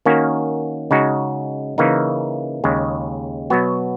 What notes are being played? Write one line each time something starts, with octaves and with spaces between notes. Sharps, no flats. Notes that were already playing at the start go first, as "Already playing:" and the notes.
D#3 A#3 C#4 F#4
C#3 G#3 D#4 F#4
C#3 E3 A#3 D#4
D#2 C#3 G#3
B2 F#3 B3 F#4